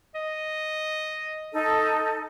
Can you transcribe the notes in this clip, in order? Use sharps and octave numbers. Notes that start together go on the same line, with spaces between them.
D#5
D#4 A4